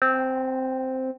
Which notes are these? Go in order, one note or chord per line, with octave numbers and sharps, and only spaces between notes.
C4